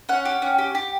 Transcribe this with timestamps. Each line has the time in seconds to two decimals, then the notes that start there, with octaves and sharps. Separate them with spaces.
0.09 C#4 F#5
0.25 G4
0.42 C#4
0.58 G4
0.75 G4